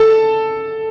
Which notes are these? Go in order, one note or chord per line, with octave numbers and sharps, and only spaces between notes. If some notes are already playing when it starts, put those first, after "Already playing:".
Already playing: A4 A5